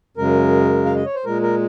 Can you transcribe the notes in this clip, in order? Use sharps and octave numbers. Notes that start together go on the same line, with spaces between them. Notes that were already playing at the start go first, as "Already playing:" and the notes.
F#2 C#3 G#3 A#4
F5
D#5
C#5
C5
A#2 G#3 A#4
A#4